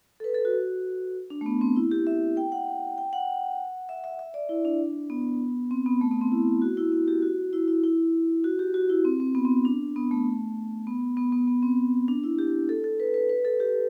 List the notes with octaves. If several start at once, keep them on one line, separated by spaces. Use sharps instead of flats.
A4
B4
A4
F#4
D4
A3
B3
C4
E4
G4
E5
G5
F#5
G5
F#5
E5
E5
E5
D5
E4
D4
B3
C4
B3
A3
B3
C4
E4
F#4
E4
E4
G4
F#4
E4
E4
E4
F#4
G4
F#4
E4
C4
C4
B3
C4
D4
B3
A3
B3
B3
B3
B3
C4
D4
E4
G4
A4
A4
B4
B4
B4
A4
G4